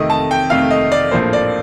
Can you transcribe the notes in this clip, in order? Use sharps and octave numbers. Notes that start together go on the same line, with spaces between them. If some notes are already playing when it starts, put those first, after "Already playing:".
Already playing: F2 C3 D#3 A3 D#5
A5
G5
F2 C3 D#3 A3 F5
D#5
D5
A#1 A2 F3 A#3 C5
D5